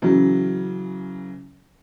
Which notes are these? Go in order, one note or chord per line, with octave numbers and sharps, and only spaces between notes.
C#3 E3 F#3